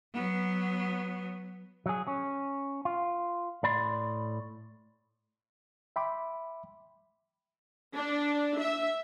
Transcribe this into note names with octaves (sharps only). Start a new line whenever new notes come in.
F#3 B3
F#3 G#4
C#4
F4
A2 D5 B5 C6
E5 G5 B5 C6 D6
D4
E5